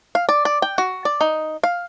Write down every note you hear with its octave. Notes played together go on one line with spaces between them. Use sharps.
F5
D5
D5
G5
F#4
D5
D#4
F5